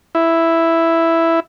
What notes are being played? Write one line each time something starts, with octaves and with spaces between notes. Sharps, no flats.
E4